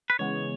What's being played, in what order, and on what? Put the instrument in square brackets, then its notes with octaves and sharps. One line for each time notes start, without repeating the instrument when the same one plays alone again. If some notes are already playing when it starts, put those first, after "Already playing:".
[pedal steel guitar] B4
[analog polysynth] C#3 E3 G#3 B3 [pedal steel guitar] C#5